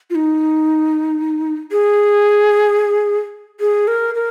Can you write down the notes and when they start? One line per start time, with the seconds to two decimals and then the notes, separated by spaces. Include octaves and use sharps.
0.10 F4
0.15 D#4
1.72 G#4
3.60 G#4
3.88 A#4
4.15 A#4